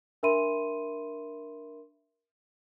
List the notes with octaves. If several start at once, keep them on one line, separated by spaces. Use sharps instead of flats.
D4 A#4 E5 B5 C6 D#7